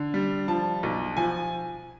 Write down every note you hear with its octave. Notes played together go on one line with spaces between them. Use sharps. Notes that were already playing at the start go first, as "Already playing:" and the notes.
Already playing: D3
G3
F3 A5
B1
F3 G#5